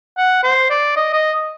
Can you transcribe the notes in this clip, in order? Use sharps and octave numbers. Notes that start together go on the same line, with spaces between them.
F#5
C5
D5
D#5
D#5